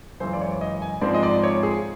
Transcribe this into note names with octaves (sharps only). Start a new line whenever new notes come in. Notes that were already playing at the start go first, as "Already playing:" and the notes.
F#2 C#3 E3 G#3 C5
D5
C#5
D#5
G#5
G#2 F3 G#3 C4 D5
D#5
D5
C#5
G#4